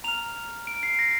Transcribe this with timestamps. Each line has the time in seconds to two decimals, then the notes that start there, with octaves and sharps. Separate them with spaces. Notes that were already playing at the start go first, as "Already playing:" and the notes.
0.04 A#5 F6 F7
0.67 D7
0.83 C7
0.99 A#6